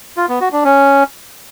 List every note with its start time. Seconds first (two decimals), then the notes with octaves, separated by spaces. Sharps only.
0.17 F4
0.29 B3
0.41 F#4
0.53 D4
0.64 C#4